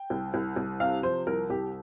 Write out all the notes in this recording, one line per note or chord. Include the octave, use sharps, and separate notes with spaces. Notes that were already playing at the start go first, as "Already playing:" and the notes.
Already playing: G5
C2
C2
C2
C3 F5
F3 C5
C2 A#4
C2 G4